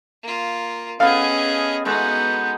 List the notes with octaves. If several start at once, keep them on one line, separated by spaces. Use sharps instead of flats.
A#3 F4
B3 C#4 G#4 A4 D#5 F5
G#3 B3 D#4 F#4 A4 G6